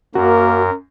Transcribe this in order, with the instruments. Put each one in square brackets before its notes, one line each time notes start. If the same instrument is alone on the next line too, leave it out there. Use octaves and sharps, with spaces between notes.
[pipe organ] F#2 [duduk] A#3 [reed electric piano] F#4 [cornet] A#4